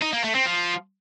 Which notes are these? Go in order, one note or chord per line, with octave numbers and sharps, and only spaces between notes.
D#4
A#3
A3
C4
F3